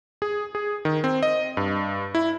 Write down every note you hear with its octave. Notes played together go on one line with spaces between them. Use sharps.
G#4
G#4
D#3
C4
D#5
G2
E4